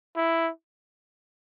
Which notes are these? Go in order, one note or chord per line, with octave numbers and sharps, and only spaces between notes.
E4